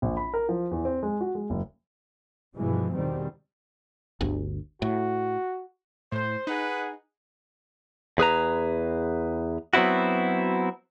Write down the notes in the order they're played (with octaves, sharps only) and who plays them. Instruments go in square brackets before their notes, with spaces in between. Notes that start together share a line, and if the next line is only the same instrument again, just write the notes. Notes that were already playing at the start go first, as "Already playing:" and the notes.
[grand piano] A#1
B5
A#4
F3
E2
C4
G#3
F#4
G#3
F#1
[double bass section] G2 B2 E3 F3 G#3
E2 B2 D#3 G3 C4
[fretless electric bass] G1 D2
[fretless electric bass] A2 [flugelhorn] F#4
[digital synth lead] A2 [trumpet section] C5
[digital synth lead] D#4 [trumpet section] G#4 B4 F#5
[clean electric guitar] E2 G#4 B4 A#5
F#3 B3 C4 E4 F#4